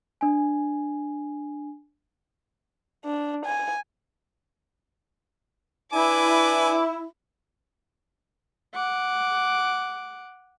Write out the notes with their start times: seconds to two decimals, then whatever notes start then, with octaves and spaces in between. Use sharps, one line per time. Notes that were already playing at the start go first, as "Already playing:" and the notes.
0.21 D4 G#5
3.05 D4
3.45 G#5
5.93 D4 E4 B4 G#5 D6
8.74 F#5 D6